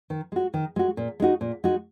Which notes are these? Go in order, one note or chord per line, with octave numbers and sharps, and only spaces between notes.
D#3
G#3 F#4
D#3
G#3 F#4
A#2
G#3 D#4 F#4
A#2
G#3 D#4 F#4